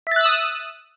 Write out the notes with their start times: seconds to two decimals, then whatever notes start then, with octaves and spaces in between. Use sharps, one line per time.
0.07 E5
0.11 A6
0.16 F#6
0.21 E6
0.26 D#6